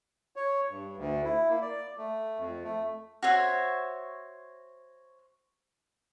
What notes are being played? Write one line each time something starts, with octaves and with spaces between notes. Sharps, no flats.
C#5
G2
D2
E4
A#3
D5
A3
F2
A3
F#4 C5 C#5 E5